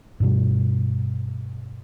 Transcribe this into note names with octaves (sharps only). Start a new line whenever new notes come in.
G2 B2 G3